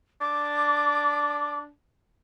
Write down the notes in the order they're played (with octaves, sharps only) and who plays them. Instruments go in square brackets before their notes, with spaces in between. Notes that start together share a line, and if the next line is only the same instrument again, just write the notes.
[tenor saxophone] D4 [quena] D6